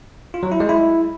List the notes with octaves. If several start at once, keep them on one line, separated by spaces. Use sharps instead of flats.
F4
F#3
E4
G#3
E4